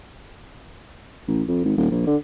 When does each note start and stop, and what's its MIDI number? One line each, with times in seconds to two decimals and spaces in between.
1.28 1.42 33
1.48 1.63 41
1.64 1.73 32
1.77 1.91 27
1.91 2.04 34
2.07 2.16 50